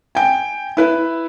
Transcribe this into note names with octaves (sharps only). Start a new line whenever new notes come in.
G5 G#5
E4 B4 E5